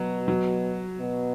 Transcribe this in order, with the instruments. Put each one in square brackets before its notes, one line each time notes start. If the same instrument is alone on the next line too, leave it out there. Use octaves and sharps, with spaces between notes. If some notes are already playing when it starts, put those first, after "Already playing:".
Already playing: [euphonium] B2 [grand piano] F#3
[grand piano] F#3
[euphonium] B2